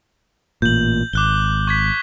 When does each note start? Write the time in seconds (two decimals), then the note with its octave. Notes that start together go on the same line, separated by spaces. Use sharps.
0.62 A1 A#2 G6 F#7
1.13 G#1 D6 F#6 G7
1.67 C#6 G#6 B6